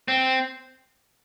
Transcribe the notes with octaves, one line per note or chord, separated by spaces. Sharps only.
C4